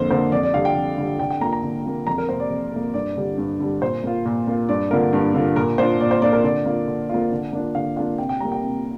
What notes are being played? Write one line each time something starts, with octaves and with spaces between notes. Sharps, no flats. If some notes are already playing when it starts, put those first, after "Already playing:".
Already playing: F2 D3 A#3 C5
D3 A#3 C5
F2 D5
D5
D3 G3 F5
G5
F2
D3 G3
D3 G5
G5
A#3 F4 A#5
A#5
D3
A#3 F4
F2 A#5
A#4
C3 A#3 C5
D5
F2
C3 A#3
G2 D5
D3 G3
G2
D3 G3
A#2 C5
A#3 F4
A#2
A#3 F4
G2 D5
D3 A#3 F4 A#4
G2
D3 A#3 F4
A#2 A#4
A#3 D4 F4 C5
A#2 D5
C5
A#3 D4 F4 D5
A#4
D3 D5
A#3 F4
D3
A#3 F4
D3
A#3 D4 F4
D3 F5
A#3 D4 F4 F5
C3 G5
G5
G3 A#3 A#5
G5
C3